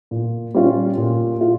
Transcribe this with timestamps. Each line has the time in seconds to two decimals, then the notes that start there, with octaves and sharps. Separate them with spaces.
0.11 A#2
0.54 G3 C#4 F4
0.98 A#2
1.41 F4